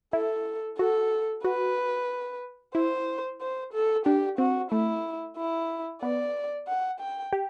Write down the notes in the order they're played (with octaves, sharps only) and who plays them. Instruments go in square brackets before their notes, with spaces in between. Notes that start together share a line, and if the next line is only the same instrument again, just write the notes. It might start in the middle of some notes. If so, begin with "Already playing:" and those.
[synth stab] E4 [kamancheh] A4
[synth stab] F#4 [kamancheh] A4
[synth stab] F#4 [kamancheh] B4
[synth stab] E4 [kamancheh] C5
[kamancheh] C5
A4
[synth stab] D4 [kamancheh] G4
[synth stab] C4 [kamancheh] F#4
[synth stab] A3 [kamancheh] E4
[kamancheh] E4
[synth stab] B3 [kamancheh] D5
[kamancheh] F#5
G5
[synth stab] G4